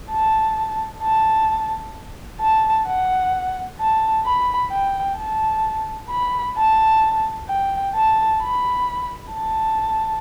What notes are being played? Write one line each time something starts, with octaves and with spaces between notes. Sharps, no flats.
A5
A5
A5
F#5
A5
B5
G5
A5
B5
A5
G5
A5
B5
A5